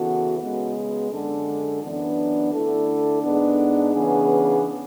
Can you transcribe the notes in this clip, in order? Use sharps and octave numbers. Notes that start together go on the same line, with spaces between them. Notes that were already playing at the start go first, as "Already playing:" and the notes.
Already playing: C#3 E3 B3 F#4 A4
C#3 G#3 B3
F#2 D3 G#3 D4 A4
F#2 E3 B3 D4
D3 A3 E4 A4
G#2 G#3 B3 D4
C#3 E3 B3 D4 G#4